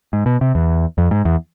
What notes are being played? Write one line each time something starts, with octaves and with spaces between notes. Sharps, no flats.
G#2
B2
C3
E2
F2
G#2
E2